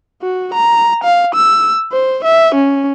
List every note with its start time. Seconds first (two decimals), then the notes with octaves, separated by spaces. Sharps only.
0.22 F#4
0.54 A#5
1.04 F5
1.35 E6
1.92 C5
2.25 E5
2.55 C#4